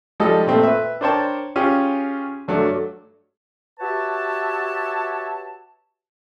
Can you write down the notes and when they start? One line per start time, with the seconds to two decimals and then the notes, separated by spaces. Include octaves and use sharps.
0.20 F3 G3 G#3 D#4 A4 D#5
0.47 A#2 A3 C4
0.63 B4 E5
1.01 D4 A#4 C5 C#5 G5 A5
1.56 C#4 F4 G4 G#4
2.48 G2 F#3 A3 D4 D6
3.79 F#4 G4 B4 C#5 E5 A5